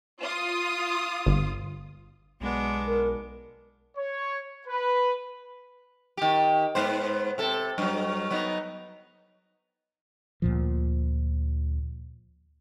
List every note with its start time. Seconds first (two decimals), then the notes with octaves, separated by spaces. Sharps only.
0.21 F4 D#6
1.26 G1
2.41 B1 G#3 B3 D4
2.87 A#4
3.97 C#5
4.67 B4
6.17 D#3 G4
6.75 G#2 B3 C5
7.38 C3 A4
7.78 G2 F#3
8.30 F#3 B3 D#4
10.42 D2 A#2 F3